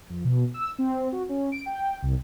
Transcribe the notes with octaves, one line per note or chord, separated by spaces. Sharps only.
F2
B2
E6
C4
F#4
C#4
D7
G5
C2